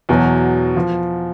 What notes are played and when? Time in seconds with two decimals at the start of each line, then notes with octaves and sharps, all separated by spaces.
0.09 E2 B2 F#3
0.77 F3